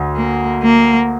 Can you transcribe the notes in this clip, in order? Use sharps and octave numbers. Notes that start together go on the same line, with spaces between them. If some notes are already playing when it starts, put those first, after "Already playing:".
Already playing: D2
A#3
A#3